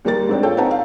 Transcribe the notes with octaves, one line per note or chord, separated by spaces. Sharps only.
D#2 G3 A#4 A6
G#2 C4 D4
F4 A4 C#5 G5
C4 D#4 B4 C#5 F#5 A5
F5